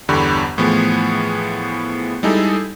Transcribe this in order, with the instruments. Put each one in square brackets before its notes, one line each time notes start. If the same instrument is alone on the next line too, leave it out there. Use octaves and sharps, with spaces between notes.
[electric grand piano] G1 E2 D3 G4 B5 C#6
A2 E3 F3 B3 G#4
G3 G#3 D#4 E4 G#4 A4